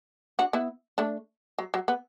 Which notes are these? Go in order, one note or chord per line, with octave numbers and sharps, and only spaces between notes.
D4 F#4
B3 E4
A3 D4
F#3
F#3
B3